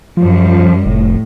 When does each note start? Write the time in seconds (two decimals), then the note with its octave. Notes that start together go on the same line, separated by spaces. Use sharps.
0.17 F#2 F3 G3
0.86 F1 A2